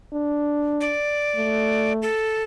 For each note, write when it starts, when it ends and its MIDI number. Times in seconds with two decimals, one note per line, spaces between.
0.13 0.95 62
0.81 1.93 74
1.36 2.07 57
2.02 2.43 69